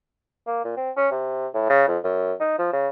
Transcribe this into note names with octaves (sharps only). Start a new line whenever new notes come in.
A#3
A#2
C4
C#4
C3
A2
C#3
F2
F#2
D#4
F3
C#3